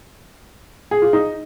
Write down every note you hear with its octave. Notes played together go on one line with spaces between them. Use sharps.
G#4
F4
D#4